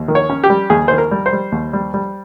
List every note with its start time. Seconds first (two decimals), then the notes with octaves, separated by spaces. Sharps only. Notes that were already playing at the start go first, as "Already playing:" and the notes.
Already playing: D#2
0.08 D#3
0.15 C#5
0.30 C#4
0.44 G4
0.50 G3
0.70 D#2 G#4
0.88 D#3 C5
0.98 A#4
1.11 G3
1.26 C5
1.33 G3
1.52 D#2
1.73 G3
1.94 G3